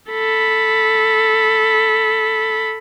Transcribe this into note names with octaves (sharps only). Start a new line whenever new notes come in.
A4 B5